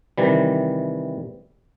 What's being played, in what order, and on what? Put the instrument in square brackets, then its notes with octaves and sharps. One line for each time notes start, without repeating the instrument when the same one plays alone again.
[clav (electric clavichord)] C3 D#3 E3 G3